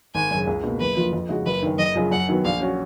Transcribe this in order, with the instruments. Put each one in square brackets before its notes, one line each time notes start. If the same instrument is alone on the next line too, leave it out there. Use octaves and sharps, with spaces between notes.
[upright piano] G#1 [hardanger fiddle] G#5
[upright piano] F#2 C#3
C#2
B2 A#3
[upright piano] F#1 [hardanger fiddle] B4
[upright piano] F2 F3 A#3 F4
F2
C#3 G#3 D#4 F#4
[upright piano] F#1 [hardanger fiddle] B4
[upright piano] F#2 D#3
[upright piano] F#1 [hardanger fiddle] D#5
[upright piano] F#2 C#3 F3
[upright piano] F#2 [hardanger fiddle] F#5
[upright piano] D#3 F#3 B3
[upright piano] A#1 [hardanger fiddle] F5
[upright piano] F#3 C#4 F#4